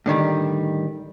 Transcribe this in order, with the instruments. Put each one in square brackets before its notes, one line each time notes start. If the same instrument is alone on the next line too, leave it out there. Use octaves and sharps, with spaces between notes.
[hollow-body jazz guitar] A2 D3 D#3 G3